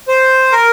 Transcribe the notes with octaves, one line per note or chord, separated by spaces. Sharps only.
C5
A#4